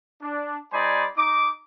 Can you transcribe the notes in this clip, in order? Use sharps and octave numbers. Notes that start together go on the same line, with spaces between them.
D4
G3 D#4 C5 D5 G#5 B5
D#4 D6